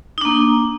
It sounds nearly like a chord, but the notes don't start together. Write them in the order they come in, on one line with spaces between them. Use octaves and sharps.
D#4 D4 A#3